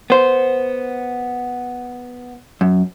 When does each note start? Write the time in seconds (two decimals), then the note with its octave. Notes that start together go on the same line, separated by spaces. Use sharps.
0.10 B3 C5
2.61 F#2